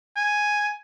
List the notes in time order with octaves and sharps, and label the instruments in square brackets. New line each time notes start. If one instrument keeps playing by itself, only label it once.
[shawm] G#5